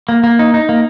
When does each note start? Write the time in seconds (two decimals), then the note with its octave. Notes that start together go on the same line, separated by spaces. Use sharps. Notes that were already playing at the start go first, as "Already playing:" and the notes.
0.09 A#3
0.24 A#3
0.39 D#4
0.54 D#4
0.69 A#3